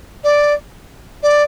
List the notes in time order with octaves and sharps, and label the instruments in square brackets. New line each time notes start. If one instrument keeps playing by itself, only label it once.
[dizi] D5
D5